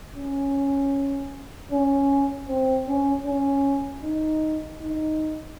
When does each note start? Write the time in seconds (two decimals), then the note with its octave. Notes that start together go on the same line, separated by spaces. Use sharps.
0.16 C#4
1.72 C#4
2.48 C4
2.88 C#4
3.26 C#4
4.03 D#4
4.81 D#4